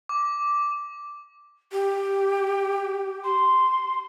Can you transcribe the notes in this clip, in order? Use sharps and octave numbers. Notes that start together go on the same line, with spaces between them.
D6
G4
C6